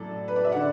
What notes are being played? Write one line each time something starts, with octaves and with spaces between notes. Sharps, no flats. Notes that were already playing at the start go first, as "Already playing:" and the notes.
Already playing: A2 F#3 A4 D5
B4
D5
E5
D3 D5 F#5